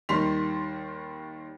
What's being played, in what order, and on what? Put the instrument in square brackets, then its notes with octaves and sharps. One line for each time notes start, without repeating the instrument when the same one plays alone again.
[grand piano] D#2 D#3 G3 C6 B6 F7